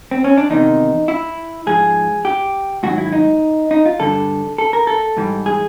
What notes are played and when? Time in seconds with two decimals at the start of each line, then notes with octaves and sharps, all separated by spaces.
0.11 C4
0.24 C#4
0.38 D4
0.50 E2 C3 D#3 D#4
1.08 E4
1.67 G#2 F3 G#4
2.25 G4
2.83 G#2 D#3 F#3 F#4
2.98 E4
3.12 D#4
3.71 D#4
3.86 F4
4.00 G2 D3 G3 A4
4.58 A4
4.73 A#4
4.87 A4
5.17 G#2 E3 G3
5.46 G#4